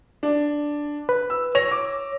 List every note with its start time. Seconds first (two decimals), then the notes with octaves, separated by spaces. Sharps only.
0.23 D4
1.09 B4
1.30 E6
1.55 C#5 A#6 F7
1.71 D6